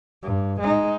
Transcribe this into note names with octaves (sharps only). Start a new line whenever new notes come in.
G2
G#3 D#4